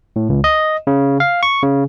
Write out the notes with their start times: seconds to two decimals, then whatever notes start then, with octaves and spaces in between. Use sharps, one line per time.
0.16 A2
0.29 C#2
0.44 D#5
0.87 C#3
1.20 F5
1.43 C#6
1.63 C#3